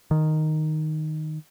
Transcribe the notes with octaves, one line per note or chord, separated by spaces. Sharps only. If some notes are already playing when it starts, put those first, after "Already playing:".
D#3